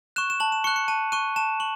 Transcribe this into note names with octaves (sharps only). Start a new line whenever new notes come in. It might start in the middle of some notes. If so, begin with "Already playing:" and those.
C#6 F#6 E7
E7
A5 F#7
E7
C#6 F#6 C#7
C#7
A5 D#7
C#6 F#6 D#7
A5 E7
C#6 F#7